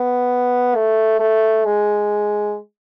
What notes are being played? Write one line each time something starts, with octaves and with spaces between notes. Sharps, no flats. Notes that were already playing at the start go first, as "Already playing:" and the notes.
Already playing: B3
A3
A3
G#3